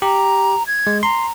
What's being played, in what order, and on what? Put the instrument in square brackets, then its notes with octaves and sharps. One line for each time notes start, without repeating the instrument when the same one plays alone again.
[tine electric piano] G4 [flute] A#5
[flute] G#6
[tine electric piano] G#3
[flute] A#5 [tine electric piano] C6